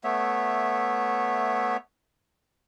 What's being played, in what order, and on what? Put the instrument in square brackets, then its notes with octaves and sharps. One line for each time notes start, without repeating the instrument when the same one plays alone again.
[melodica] A3 B3 C#5 E5